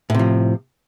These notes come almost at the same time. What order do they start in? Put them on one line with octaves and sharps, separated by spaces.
A2 C3 F3